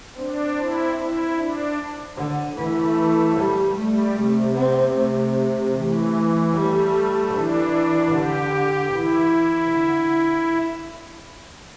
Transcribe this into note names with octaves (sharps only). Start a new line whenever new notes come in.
C4 D4
E4
E4
D4
D3
E3 A3
G3
G3 A3
C3 A3
C4
A3
E3 A3
G3 A3
E3 D4
D3 G4
E3 E4
D3